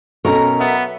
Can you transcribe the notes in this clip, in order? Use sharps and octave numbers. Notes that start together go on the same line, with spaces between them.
B2 F#3 C#4 A4 A#4 D#5 A#5 C#6
B3 E5